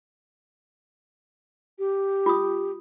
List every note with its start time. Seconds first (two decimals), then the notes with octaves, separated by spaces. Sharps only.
1.78 G4
2.26 F4 D#6